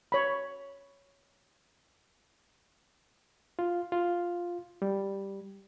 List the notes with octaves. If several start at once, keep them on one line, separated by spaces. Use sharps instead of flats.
C#5 B5
F4
F4
G3